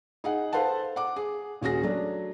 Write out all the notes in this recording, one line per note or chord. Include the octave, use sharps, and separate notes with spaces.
D#4 G#4 F#5
A4 B4 C5 F5 F#5 A5
F#5 D6
G#4
D#1 C#4 F#4 G#4 A#6
F#3 A3 D4